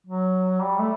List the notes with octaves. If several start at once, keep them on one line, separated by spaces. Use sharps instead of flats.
F#3
G3
A3